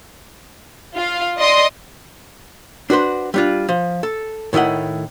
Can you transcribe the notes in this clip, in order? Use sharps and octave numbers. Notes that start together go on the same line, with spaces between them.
F4 F5
D5 D#5 C6 D#6
D4 F#4 B4 C5
G3 D4 F4
F3
A4
A2 D#3 E4 D#5 F#5